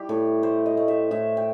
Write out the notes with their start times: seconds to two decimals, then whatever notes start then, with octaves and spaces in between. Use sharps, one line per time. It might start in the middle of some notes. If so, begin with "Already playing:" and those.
Already playing: G3 E4 G4
0.09 A2 A4
0.43 A3 C5
0.66 D#5
0.77 A3
0.88 E5
1.11 A2 E5
1.37 G5